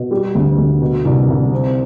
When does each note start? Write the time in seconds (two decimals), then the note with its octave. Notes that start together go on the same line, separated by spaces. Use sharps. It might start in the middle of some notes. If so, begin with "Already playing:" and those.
Already playing: B2
0.11 G3
0.35 D2
0.58 D2
0.81 B2
1.05 C2
1.28 C2
1.52 C4